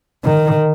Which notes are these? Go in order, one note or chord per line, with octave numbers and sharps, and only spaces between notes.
D#3